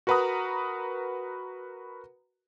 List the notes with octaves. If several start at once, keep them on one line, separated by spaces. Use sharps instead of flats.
F#4 A#4 B4 F#5 A#5 D#6